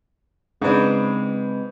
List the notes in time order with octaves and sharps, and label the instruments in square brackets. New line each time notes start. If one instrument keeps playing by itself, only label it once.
[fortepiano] G#2 D4 [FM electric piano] C#3 B4 [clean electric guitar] G#3 C4